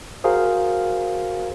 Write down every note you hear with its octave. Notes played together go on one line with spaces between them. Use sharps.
F#4 G#4 A#4 C5 F5